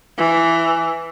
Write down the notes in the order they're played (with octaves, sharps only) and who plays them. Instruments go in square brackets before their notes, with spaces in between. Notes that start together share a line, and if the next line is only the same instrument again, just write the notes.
[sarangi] E3